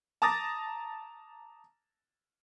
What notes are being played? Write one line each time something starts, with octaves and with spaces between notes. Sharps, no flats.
A5 A#5 D6 D#6 A6 A#6